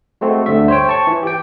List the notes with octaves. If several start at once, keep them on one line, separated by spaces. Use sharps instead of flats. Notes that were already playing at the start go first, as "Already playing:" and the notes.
G#3 A3 C4 F#4
D2 D3 G3 A3 E5
C5 C#5 G5
A5 C#6
E3
G4 G5